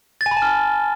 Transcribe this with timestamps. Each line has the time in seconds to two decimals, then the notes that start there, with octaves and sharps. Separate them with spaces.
0.21 A6
0.26 G#5
0.31 B5
0.37 A5
0.42 F6